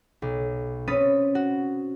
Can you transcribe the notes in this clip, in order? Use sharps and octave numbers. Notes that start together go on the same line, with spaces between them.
B1
C4 C#4 B4 D#6 A6
F#4